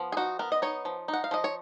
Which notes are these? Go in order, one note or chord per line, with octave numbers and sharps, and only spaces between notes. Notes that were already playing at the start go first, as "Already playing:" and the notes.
Already playing: F3 B3
G#4
D#4 F#4
B3 A#4
D#5
D#4 C#5
F3
D#4
F#5
F5
F3 D#5
C#5